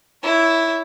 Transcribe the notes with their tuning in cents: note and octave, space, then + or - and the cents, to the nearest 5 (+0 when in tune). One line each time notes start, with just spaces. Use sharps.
E4 +0 C#5 +20